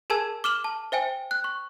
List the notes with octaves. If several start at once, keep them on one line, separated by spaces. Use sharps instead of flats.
G#4 A#4 G#5 A5 E6 G#6
D6 F6 E7 F#7
A5
C5 E5 G5 G#5
F#6
C#6